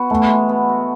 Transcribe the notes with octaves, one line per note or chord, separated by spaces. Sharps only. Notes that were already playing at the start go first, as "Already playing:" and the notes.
Already playing: B3 F#4
E3 A3
G#3
B3
F#4